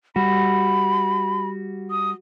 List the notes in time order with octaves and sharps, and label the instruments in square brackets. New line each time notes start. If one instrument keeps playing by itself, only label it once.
[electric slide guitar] G3 F#4 [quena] B5
[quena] D#6